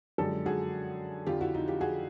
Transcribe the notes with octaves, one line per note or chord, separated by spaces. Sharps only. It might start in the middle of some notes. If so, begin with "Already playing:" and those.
F#2 D3 F3 G#3 G4 A4
F#4 G#4
F2 D3 F3 F4 G4
E4 F#4
D#4 F4
F4 G4
F#4 G#4